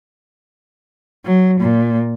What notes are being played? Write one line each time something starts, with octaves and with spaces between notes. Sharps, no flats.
F#3
A#2